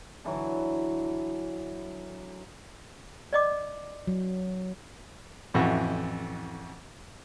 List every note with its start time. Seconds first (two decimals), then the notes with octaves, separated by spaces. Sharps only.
0.24 D3 E3 F#3
3.33 D5 D#5 D6
4.07 F#3
5.54 A1 F2 E3 F#4 E5